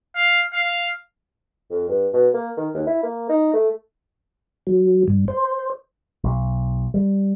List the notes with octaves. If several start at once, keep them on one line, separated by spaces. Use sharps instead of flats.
F5
F5
F2
G2
B2
A#3
D#3
D#2
E4
A#3
D#4
A3
F#3
G2
C5
B1
G3